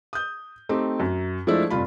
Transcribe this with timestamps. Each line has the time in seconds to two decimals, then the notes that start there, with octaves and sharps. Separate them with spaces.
0.13 D#6 G6
0.69 A3 C4 D#4 G4
1.00 F#2
1.47 F3 G#3 A3 D4 E4
1.70 F1 G2 F4 B5